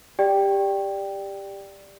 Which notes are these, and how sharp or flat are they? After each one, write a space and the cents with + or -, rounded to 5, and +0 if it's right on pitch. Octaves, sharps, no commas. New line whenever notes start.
G4 +15 D5 +0 G5 +0